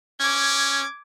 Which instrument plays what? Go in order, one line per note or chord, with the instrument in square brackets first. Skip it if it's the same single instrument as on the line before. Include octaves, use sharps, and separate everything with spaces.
[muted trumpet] C#4 [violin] D6 G#6